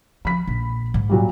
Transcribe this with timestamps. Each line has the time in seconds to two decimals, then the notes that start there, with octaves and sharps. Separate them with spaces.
0.25 F3 B5 B6
0.47 A#1
0.94 G#2
1.09 A#2 F#3 G3